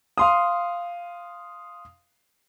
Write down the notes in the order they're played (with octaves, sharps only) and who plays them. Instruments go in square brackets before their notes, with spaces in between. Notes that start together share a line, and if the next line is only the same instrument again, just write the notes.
[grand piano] F5 C6 D#6